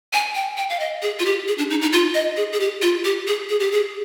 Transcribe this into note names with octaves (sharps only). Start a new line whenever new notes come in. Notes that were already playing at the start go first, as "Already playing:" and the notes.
G#5
G5
G5
F5
D#5
G#4
F4
G4
G#4
D4
D#4
D#4
F4
D#5
G#4
G#4
G4
F4
G4
G#4
G#4
G4
G#4